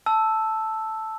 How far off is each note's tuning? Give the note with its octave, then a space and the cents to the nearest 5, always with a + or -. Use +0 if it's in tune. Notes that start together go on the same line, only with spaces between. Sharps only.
A5 +0 E6 +0